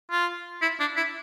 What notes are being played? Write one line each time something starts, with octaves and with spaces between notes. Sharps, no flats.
F4
E4
D4
E4